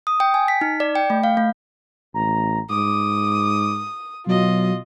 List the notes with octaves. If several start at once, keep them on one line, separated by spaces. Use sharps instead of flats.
D#6
G5
G#5
B6
D#4
D5
G5
A3
F5
A3
A1 A#5
G#2 D6 D#6
B2 F#3 F4 D#5